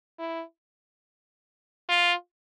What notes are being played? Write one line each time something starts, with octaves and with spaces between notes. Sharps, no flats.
E4
F4